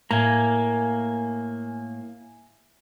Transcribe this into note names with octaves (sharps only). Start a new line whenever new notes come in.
A2 A#3 G#5 A#5